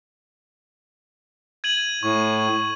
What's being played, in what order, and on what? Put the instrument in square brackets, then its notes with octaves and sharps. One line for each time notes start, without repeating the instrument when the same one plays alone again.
[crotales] G#6 D#7 F#7
[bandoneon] A2 [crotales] C#6